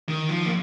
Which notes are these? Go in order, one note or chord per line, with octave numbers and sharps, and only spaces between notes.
D#3
F3
A#3